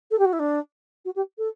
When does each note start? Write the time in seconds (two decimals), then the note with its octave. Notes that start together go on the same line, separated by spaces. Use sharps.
0.11 A4
0.18 G4
0.25 F#4
0.33 E4
0.39 D4
1.05 F#4
1.16 G4
1.38 A4